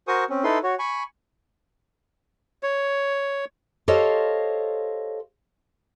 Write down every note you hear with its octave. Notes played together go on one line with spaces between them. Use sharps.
F#4 A#4 C5 G#5 C#6 D#6
C4 C#4
D#4 E4 A4 B4 C6
F#4 C#5
G#5 B5 C#6
C#5
G4 A4 C5 C#5 D#5 F5